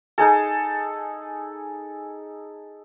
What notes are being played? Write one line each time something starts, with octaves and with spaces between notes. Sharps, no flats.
D#4 G#4 A4